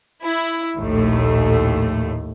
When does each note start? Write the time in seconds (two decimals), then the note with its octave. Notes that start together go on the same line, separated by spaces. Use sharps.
0.23 E4
0.77 A#1 D#2 A2 A3